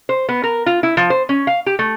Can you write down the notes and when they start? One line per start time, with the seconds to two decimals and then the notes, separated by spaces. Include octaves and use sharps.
0.09 C5
0.29 B3
0.43 A#4
0.66 F4
0.83 E4
0.97 F3
1.10 C5
1.29 C#4
1.47 F5
1.66 G4
1.79 A3